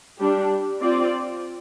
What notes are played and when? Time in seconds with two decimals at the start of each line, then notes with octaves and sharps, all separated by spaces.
0.18 G3 D4 G4
0.82 C4 F4 D5